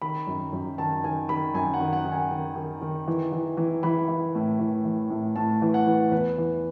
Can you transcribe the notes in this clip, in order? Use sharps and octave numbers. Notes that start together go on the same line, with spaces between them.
D#3 B5
F#2
F#2
D#3 A5
D#3 G#5
D#3 B5
F#2 G#5
F#5
D#3
F#5
D#3
G#5
D#3
D#3
D#3
E3
E3
E3
E3 B5
E3
A2
E3
E3
A2
A2 A5
E3
F#5
E3
E2 B4
E3